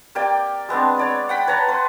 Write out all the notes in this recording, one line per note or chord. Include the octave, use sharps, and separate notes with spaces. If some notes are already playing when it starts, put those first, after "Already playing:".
A#3 G4 D5 G5
G#3 B3 C4 D4
C#5 D5 B5
F#5 G5 B5
B4 C#5 A5 A#5
B4 C6